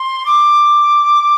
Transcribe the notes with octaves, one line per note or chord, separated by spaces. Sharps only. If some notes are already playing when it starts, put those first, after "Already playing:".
Already playing: C6
D6